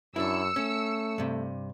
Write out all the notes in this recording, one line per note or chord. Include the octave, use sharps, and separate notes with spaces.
F#2 D4 E4 E6 C#7
A3 C#4
G2 C3